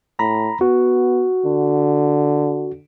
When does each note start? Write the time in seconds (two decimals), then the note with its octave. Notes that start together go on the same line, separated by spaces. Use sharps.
0.19 A2 A#5 B5
0.61 B3 F#4
1.45 D3